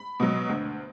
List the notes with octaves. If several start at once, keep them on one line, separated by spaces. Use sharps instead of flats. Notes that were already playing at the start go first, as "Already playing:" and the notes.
Already playing: B5
B2 F#3
D2